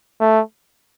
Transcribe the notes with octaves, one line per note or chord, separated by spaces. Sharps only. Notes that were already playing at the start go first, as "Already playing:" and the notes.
A3